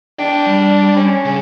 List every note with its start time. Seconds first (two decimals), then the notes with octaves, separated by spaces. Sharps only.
0.19 E2 D4 G5
0.46 G3
0.97 C#4
1.25 C#3